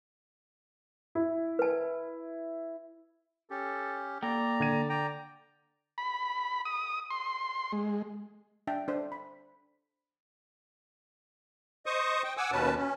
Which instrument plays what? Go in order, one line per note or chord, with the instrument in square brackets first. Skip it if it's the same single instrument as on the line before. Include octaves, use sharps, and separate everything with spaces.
[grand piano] E4
[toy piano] B4 A5
[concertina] C#4 G4 [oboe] A4
[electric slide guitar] A#3 A4 G5 [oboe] D5 [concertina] A#5
[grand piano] D3 G#6 D#7
[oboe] D5 [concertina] G5 A#5
[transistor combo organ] B5
D#6
C6
G#3
[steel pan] D4 E5 G5 A5
D4 C5
B5
[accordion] C5 D#5 C#6 D#6
G5
F#5 G#5 D6 E6
D#2 B2 C#4 B4 A5
C#4